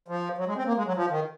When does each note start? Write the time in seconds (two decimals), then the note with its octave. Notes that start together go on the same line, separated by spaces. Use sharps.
0.08 F3
0.38 F#3
0.47 G#3
0.57 C4
0.66 A#3
0.76 G#3
0.86 F#3
0.96 F3
1.10 D#3